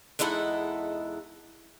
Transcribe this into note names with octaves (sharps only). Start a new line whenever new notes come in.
E2 G#3 D#4 E4 A4 F#5